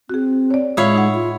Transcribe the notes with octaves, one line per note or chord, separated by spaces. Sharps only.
C4 F#4 G#4
C#5 D5
A2 G#3 E4 F4 C#5 F5 D#6
D#4 F#5
F4